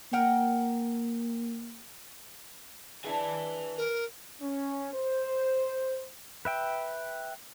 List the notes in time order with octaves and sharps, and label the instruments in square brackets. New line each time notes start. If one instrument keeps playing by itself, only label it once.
[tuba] A#3 [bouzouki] A#4 F#5 G5
[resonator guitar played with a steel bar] D4 E4 G#4 [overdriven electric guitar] B4 G#5
[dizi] A#4
[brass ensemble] C#4
C5
[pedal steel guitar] B4 E5 G5